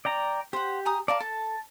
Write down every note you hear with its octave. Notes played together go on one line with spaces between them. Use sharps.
D5 G5 A#5
G4 C5 F#5
G#5 A#5 D#6
A#4 D5 F5 A5
A4 A5